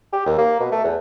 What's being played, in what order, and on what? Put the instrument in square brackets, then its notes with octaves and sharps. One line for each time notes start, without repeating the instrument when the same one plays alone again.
[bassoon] G4
D#2
A#3
B2
A3
E2